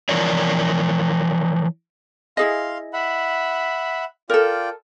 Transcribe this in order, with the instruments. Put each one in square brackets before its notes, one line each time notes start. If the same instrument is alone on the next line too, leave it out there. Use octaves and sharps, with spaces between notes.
[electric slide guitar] E3 F3 A#4 C#5 D5
[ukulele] E4 G#4 D#5 [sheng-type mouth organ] F5 C6
[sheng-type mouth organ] E5 F#5 B5
[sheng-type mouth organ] F4 D5 G5 [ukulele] A4 A#4